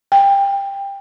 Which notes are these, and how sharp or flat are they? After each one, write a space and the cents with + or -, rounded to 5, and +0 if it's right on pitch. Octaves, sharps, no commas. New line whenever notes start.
G5 +20